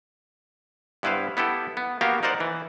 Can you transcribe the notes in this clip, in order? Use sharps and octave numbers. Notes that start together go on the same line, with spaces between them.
G2 B3 E4 B4 C5 F5
B3 E4 G4 A4
B3
A#3 B3 F#4 G4 F5
D#4 A#4 C5 D5 F#5
E3